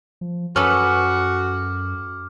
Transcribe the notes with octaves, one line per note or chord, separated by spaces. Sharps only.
F3
F#2 C#4 F#4 A4 B4 D6 F6